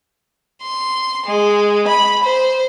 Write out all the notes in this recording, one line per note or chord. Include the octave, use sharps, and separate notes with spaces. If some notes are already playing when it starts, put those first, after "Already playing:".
C6
G#3
B5
C5